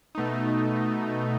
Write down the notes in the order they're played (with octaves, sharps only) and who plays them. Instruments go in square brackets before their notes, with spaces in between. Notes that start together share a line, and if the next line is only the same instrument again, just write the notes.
[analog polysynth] B2 A3 D#4